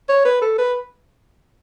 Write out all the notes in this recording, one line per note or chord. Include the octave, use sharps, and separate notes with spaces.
C#5
B4
A4
B4